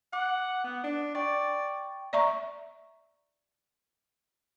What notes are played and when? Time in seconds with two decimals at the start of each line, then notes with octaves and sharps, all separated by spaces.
0.13 F#5 D6
0.64 B3
0.84 D4
1.15 D5 G5 C#6 A6
2.13 D5 E5 A#5 C#6